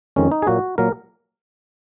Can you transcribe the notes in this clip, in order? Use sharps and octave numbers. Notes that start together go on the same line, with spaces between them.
F2 D#3 G#3 C#4
D#4
G#4
A#2 F#3 A#3 F#4
A#2 F#3 A#3 A#4